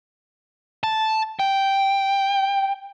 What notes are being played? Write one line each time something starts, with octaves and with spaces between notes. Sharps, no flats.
A5
G5